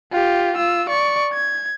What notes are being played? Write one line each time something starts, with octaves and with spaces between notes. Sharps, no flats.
F4 G4
F4 E6
D5 C#6
G#6